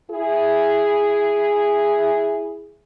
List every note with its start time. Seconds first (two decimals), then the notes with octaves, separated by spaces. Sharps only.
0.10 E4 G#4